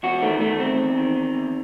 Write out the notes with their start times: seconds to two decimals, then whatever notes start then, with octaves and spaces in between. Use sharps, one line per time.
0.03 E2 F#4
0.22 D#3 A3
0.40 D#3 A3
0.59 E2 C4
0.78 E2
0.97 D#3
1.16 D#3
1.35 E2